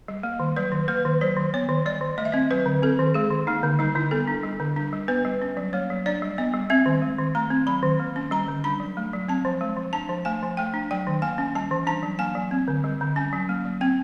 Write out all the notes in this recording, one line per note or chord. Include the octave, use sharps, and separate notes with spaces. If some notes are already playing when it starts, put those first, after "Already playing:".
G3
A#3
D#3
F#3 B4
D#3
A#3 B4
D#3
F#3 C5
D#3
B3 C#5
D#3
G3 D5
D#3
A3 D#5
E5
C4 D#5
F#3 B4
D3
C4 A4
D#3
G#3 G#4
D#3
A#3 D#4
D3
G3 D#4
D3 E4
B3 A4
D4
G3
D3
D4
G3
B3 B4
G3
C#4
F#3
A#3 C#5
F#3
D4 D5
G3
B3 D#5
G3
C4 E5
D#3
G#3
D#3
A3 A#5
C4
F#3 B5
D#3
A#3
C#4
G3 A#5
D3
D4 B5
F#3
A3
F#3
C4 A5
F3
G#3
F3
D4 A5
F3
A3 G#5
F3
A3 G5
D4
F#3 G5
D#3
A#3 G#5
C#4
G3 A5
E3
D4 A5
F#3
A#3 G#5
F#3
C4
D3
G3
D3
C#4 G#5
F#3
A#3
F#3
C4 G5